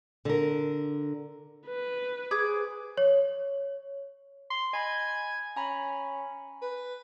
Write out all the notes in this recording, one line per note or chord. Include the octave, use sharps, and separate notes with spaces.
D3 A#4
B4
G#4 C5 D6
C#5
C6
D#5 G#5 B5
C#4 G#5 A#5 B5
B4